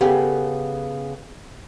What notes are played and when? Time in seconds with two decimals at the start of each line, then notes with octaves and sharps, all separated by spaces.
0.01 C#3 B3 G4 A4 G5